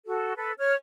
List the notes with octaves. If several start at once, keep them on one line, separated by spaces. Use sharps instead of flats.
F#4 A4
A4 B4
C#5 F6